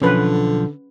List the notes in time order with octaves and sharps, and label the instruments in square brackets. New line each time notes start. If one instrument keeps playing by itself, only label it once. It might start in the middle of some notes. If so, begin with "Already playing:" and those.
[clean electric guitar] B1 F3 [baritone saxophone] D3 [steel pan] C#4 B4